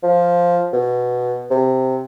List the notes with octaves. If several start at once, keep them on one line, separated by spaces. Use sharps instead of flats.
F3
B2
C3